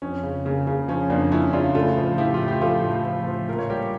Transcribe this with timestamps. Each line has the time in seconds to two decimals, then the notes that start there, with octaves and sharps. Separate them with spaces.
0.02 F2 C#4
0.23 C#3
0.45 C#3 A#3
0.67 C#3
0.88 F3 C#4
1.10 F2 A#3 D4
1.32 F2 C#4 E4
1.53 C#3 D4 F4
1.75 A2 F4 A4
1.97 F3
2.18 F3 E4 G4
2.34 F4
2.40 A2
2.48 G4
2.61 F3 F4 A4
2.84 A2
3.05 F3
3.27 F3
3.49 A#2 A#4
3.59 C#5
3.70 G3 G4 A#4